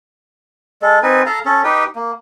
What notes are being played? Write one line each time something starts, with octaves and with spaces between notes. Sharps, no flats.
G#3 A4
C4 D#4 B4 G#5
A4 F5 A5 A#5
C#4 A4
D#4 G4 B4 G5
A#3